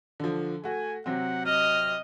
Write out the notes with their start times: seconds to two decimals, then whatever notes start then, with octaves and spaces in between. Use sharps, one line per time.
0.20 D3 F3
0.64 A3 F#4 G#5
1.06 C3 F#3 C4 F#5
1.46 D#5 F6